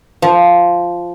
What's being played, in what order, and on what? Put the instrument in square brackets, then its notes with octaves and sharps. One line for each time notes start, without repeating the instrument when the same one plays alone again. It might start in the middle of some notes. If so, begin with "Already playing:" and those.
[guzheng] F3